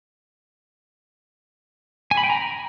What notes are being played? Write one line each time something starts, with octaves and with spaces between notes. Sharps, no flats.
G#5
B5
G5
A#5